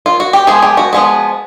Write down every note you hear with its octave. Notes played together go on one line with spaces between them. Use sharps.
F4
F#4
G4
F3 G#3 B3 G#4
G4
F#4
F3 G#3 B3